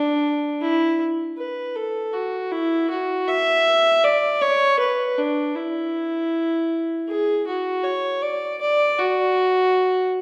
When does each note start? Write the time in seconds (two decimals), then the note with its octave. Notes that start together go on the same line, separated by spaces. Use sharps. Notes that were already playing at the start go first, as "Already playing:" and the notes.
Already playing: D4
0.61 E4
1.38 B4
1.76 A4
2.14 F#4
2.52 E4
2.90 F#4
3.28 E5
4.04 D5
4.42 C#5
4.80 B4
5.18 D4
5.56 E4
7.08 G#4
7.47 F#4
7.84 C#5
8.22 D5
8.61 D5
8.98 F#4